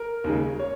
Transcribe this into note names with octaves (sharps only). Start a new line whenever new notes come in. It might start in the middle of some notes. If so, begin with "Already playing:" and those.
Already playing: A#4
D#2 C#3 G#3
C#5